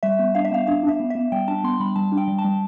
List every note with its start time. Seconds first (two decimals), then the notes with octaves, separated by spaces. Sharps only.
0.03 G3 E5
0.19 B3
0.35 D4 F5
0.45 E5
0.51 B3 F5
0.67 D4 F5
0.83 D4
0.88 E5
1.00 B3
1.10 B3 E5
1.32 G3 G5
1.48 D4 A5
1.64 B3 C6
1.80 G3 B5
1.96 G3 A5
2.12 D4
2.17 G5
2.28 G3
2.38 A5
2.45 G3